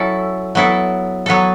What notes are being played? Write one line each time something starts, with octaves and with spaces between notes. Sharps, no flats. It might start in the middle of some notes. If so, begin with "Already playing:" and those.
Already playing: F#3 C#4 E4 A4
F#3 B3 E4 A4
F#3 B3 A4